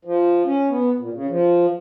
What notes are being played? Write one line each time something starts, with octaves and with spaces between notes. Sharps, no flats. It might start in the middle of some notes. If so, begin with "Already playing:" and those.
F3
C#4
B3
A#2
C#3
F3